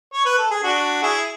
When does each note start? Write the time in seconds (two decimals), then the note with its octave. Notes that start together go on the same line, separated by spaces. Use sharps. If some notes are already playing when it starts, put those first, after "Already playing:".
0.14 C#5
0.26 B4
0.38 A4
0.51 G#4
0.63 D4 F#4
1.03 E4 G#4